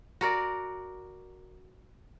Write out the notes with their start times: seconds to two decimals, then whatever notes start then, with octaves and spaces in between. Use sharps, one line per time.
0.21 F#4 A#4 D5